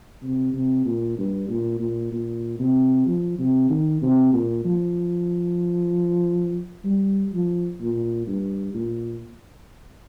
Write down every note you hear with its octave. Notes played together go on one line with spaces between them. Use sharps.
C3
C3
A#2
G2
A#2
A#2
A#2
C3
F3
C3
D#3
C3
A#2
F3
G3
F3
A#2
G2
A#2